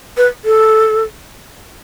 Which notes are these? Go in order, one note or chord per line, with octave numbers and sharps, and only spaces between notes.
B4
A4